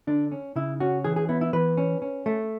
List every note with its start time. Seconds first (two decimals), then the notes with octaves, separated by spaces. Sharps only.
0.07 D3 D4
0.32 C#4
0.56 C#3 E4
0.80 C#4 F#4
1.04 E3 G#4
1.16 G#4
1.29 B3 E4
1.41 E4
1.53 E3 B4
1.77 C#4
2.02 C#4
2.26 A3